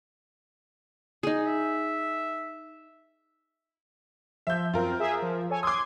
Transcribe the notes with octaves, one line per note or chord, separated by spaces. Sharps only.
D#4 G#4
E5
F3 E5 G6
F#2 C4 F4 A#4
G#4 E5
F3
A4 C#5 G#5
C6 D6 D#6 G#6